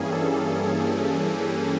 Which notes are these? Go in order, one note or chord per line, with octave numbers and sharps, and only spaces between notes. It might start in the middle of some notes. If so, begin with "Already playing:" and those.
Already playing: G2 E3 G3 A#3 C#4 G#4
A4